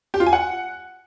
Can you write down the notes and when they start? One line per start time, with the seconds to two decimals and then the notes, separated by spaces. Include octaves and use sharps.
0.14 G4
0.20 F4
0.26 G#5
0.33 F#5